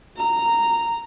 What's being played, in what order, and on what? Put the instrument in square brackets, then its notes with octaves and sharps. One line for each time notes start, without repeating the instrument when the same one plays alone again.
[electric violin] A#5